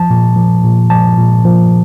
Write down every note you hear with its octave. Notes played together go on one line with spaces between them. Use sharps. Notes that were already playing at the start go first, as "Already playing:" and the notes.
Already playing: F3 A5
A#2
F3
A#2
F3 A5
A#2
F3